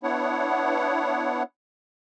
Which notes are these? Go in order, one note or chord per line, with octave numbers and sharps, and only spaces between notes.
B3 D4 E4 C#5 F#5